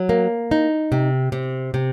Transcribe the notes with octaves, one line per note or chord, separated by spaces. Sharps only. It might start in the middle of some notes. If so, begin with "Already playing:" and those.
Already playing: F#3
A#3
D#4
C3
C3
C3